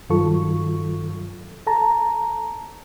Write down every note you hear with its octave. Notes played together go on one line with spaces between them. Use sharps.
G2 D#3 F#3 F4 A4 C#6
A4 A5 A#5